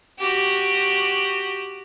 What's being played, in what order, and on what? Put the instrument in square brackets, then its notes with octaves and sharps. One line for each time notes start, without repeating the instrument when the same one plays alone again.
[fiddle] F#4 G4